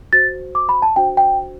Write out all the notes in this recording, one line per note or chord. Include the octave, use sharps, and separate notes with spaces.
F#4 C5 A6
D6
B5
A5
D4 F#4 C5 G5
G5